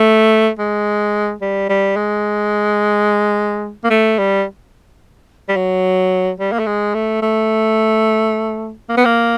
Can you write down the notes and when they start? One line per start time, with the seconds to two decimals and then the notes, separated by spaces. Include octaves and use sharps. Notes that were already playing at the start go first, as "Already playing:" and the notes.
Already playing: A3
0.59 G#3
1.42 G3
1.69 G3
1.97 G#3
3.84 A#3
3.90 A3
4.19 G3
5.49 G3
5.56 F#3
6.40 G3
6.52 A#3
6.59 A3
6.66 G#3
6.94 A3
7.22 A3
8.89 A#3
8.97 B3
9.05 A#3